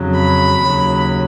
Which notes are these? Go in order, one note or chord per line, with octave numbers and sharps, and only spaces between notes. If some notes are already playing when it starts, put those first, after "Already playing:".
Already playing: F2 C#3 F#3
B5
D#2 C#3 F#3